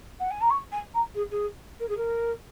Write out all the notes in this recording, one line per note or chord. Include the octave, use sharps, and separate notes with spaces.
F#5
G#5
A#5
C#6
G#5
A#5
G#4
G#4
A#4
G#4
A#4